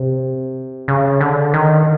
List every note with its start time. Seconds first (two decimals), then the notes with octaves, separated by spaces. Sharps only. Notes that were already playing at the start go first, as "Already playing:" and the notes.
Already playing: C3
0.88 C#3
1.21 D3
1.54 D#3